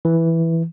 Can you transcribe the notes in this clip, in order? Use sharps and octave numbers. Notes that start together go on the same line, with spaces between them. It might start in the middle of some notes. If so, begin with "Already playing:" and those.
E3